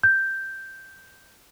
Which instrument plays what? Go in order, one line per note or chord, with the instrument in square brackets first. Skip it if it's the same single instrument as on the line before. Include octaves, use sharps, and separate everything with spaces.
[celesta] G6